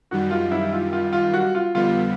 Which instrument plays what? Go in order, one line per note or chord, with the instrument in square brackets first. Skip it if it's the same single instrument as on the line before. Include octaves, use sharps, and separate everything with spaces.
[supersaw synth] F#2 D#3 G3 [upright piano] F#4
[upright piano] F4
E4
F4
F4
F4
F#4
F4
[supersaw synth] F2 D3 G3 B3 [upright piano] F4